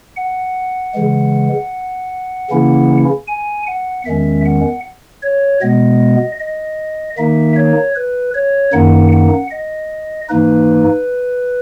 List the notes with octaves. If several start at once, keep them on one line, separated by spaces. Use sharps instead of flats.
F#5
C#3 E3 G#3
C#3 E3 A#3 C#4 E4
G#5
F#5
E2 D#3 G#3 C#4 E5
F#5
C#5
B2 G#3 B3 D#5
D#5
D#3 A#3 D#4 E5
C#5
B4
C#5
F#2 D#3 A#3 D#4 F#5
F#5
D#5
G#2 E3 A#3 D#4 B4